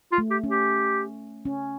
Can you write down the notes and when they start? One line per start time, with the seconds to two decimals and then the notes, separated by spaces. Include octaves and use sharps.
0.12 F4
0.18 A3
0.31 G4
0.44 C#4
0.50 G4
1.45 C#4